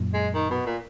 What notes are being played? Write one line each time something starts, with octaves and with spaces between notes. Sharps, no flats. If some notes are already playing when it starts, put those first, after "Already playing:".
Already playing: F#2 A#2
G#3
D#3
B2
A#2